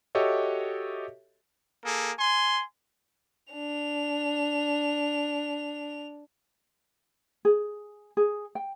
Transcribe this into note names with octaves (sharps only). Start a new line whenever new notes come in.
F#4 G4 A4 C#5 D#5 E5
A#3 G#4 A4
G#5 C6
D4 F7
G#4
G#4
G5